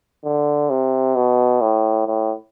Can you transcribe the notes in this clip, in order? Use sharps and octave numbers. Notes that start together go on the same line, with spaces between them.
D3
C3
B2
A2
A2